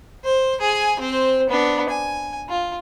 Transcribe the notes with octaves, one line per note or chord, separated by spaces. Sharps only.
C5
G#4 G#5
C4 C5
B3 D4
G#5
F4